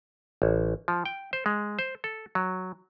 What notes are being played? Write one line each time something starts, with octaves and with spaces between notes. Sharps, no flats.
A1
F3
G5
C5
G#3
C5
A4
F#3